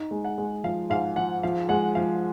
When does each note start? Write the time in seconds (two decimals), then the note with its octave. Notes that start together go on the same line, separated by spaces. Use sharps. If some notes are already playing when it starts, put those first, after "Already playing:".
Already playing: D#4
0.11 G#3
0.25 F#5
0.38 G#3
0.64 F3 F5
0.90 G#2 F5
1.16 F3 F#5
1.43 F3 F5
1.69 G#3 F#5
1.95 F3 F5